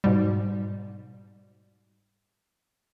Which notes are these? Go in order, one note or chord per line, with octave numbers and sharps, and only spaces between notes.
G#2 B2 G3